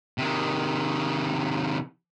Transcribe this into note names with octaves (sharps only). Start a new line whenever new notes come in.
C3 D#3